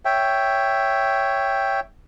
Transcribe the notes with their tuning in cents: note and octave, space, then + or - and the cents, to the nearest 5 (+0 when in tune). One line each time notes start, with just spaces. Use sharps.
C#5 +0 E5 +5 G5 +0